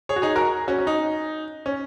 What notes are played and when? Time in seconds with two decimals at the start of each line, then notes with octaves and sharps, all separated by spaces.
0.09 G#4 C#5
0.16 F#4
0.22 D#4 G#4
0.36 F#4 A#4
0.68 C#4 F#4
0.79 C#4
0.87 D#4
1.66 C#4